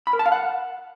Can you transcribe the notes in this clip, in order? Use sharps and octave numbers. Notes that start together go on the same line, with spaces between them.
B5
A#4
A5
F5
F#5